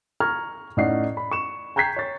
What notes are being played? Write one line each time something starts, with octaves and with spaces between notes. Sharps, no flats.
A#5 C#6 F6 G#6
A2 C#4 D#4 D5 F#5 C7
B5
C#6 E7
G5 A#5 G6 G#6 B6 C7
C#5 A6